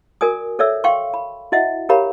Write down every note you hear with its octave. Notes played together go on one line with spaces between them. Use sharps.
F#4 A#4 D5 G#5 D#6
A4 C#5 D5 E5 E6
F5 G5 C6 C#6
B5
E4 F#4 D#5 E5 F#5
G4 A#4 C#5 F5 A#5 B5